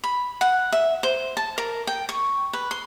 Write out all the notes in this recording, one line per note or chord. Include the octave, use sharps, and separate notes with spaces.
B5
F#5
E5
C5
A5
A#4
G5
C#6
B4
C6